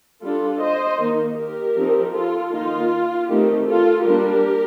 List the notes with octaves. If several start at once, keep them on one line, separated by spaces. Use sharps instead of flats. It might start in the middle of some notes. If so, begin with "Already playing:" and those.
G3 D4 F4 A4
C5 D#5
D#3 A#3 D#4
G4 A#4
F3 C4 D#4
F4 A4
D#3 A#3 D#4 F4
D#3 A3 C4 D#4 G4
F4 A4
G3 A#3 D4 G4 A#4